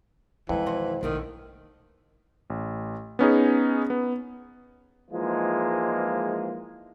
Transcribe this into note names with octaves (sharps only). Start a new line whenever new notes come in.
F2 D#3 E3 G#3
B2 F#4 C5
A#1 D3 D#3 A3 C4
A1
B3 C#4 D#4 G#4
B3
G#2 E3 F3 G#3 A#3 F4